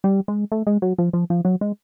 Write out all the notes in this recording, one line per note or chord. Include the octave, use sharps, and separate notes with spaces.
G3
G#3
A3
G#3
F#3
F3
F3
F3
F#3
G#3